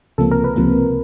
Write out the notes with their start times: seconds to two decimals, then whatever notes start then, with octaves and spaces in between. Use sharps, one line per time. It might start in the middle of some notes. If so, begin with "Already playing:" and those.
0.18 C#2 C3 F3 A#3 A4
0.31 A#4
0.44 B4
0.56 C#2 C3 F3 A#3